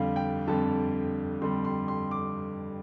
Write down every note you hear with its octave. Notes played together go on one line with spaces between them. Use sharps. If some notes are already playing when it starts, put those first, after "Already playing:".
Already playing: F2 D3 G3 F5
G5
F2 D3 G3 A5
F2 D3 G3 C6
C6
C6
D6